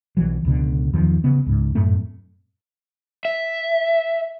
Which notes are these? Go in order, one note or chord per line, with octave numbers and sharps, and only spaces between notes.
B1 E3 F#3
C#2 B2 D3
E2 D#3 F3
C#3 B3
C#2 G#2
F#2 A2 A3 C4
E5